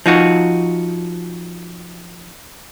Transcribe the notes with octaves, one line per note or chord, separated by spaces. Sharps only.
F3 D#4 F#4